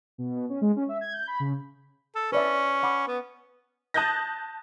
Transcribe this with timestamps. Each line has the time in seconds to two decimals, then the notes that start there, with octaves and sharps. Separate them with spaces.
0.18 B2
0.36 B2
0.49 C#4
0.61 G#3
0.76 C#4
0.89 E5
1.01 G#6
1.13 G6
1.27 B5
1.40 C#3
2.15 A4
2.32 C#4 B4 D5 E5
2.83 F#5 B5 D6
3.07 B3
3.94 A5 D#6 F#6 G6 A6 A#6